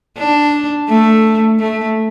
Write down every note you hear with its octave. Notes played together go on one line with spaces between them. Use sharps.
D4
A3
A3